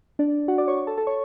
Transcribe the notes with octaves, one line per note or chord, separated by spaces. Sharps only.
D4 D5
F#4 F#5
D5 D6
C#5 C#6
A4 A5
A4 A5
C#5 C#6